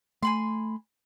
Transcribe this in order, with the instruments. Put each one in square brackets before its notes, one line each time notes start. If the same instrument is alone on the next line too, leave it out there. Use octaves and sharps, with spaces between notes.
[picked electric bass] A3 [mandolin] G#5 B5 C6